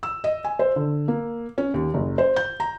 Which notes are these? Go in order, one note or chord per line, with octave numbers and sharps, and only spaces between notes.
E6
D#5
G#5
C5
D3
A#3
C#4
D#2
F#1
C5
G6
A#5